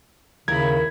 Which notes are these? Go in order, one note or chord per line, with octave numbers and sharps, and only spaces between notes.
D#2 C#3 E4 A#4 B5 G#6